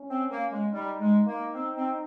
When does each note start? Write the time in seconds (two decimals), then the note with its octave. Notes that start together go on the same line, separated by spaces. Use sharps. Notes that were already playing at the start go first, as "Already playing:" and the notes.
Already playing: C#4
0.10 C4
0.31 A#3
0.52 G#3
0.72 G3 D#4
0.99 G#3
1.27 A#3
1.54 C4
1.76 C4